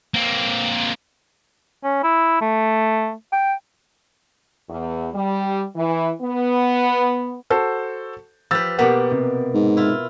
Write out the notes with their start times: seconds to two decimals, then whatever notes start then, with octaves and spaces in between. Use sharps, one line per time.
0.14 A#3 C4
1.84 C#4
2.04 E4
2.41 A3
3.32 G5
4.69 E2
5.14 G3
5.76 E3
6.22 B3
7.50 F#4 A4 C5
8.51 F3 G4 B4 E6 A6
8.79 B2 A#3 B3 G4 F#5
9.11 C3
9.54 G#2
9.77 E4 F4